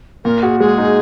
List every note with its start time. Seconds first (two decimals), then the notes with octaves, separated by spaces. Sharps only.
0.24 A#2 A#4
0.43 F#4 G#4
0.60 G#3 G#4
0.78 D#4